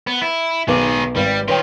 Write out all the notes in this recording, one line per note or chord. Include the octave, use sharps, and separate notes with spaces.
B3
E4
B1 D#3 G#4 B4 D6
G#1 G3 B4
D#3 F4 B4 C#5 G5